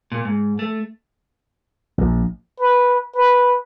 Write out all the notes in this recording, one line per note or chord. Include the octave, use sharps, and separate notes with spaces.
A#2
G#2
A3
A#1
B4
B4